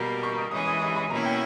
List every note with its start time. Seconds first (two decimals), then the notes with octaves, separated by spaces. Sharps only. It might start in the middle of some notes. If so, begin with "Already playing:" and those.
Already playing: B2 G3 A#3
0.23 C#6
0.38 D#6
0.51 E3 G#3 C#4 G#4 D#6
0.67 D#6
0.82 D#6
0.96 B5
1.10 B2 A#3 C#4 E4 A#5
1.25 G5